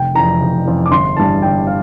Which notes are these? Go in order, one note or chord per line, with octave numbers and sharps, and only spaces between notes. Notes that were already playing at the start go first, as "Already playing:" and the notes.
Already playing: F1 G5
F2 E3 A#5
F1
F2 E3
D6
G1 C6
G2 E3 A5
G1 G5
F5